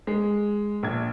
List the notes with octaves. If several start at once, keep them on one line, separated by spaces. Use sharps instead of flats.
G#3
A#1 G#6